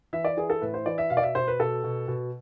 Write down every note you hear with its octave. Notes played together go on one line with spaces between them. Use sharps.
E3 E5
D5
E3 G#4
A4
A2 B4
C5
E3 D5
E5
B2 F5
D5
E5
B2 C5
B4
B2 A4
B2
B2